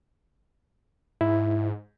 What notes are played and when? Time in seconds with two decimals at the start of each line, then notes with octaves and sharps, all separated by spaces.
1.21 G#2 E4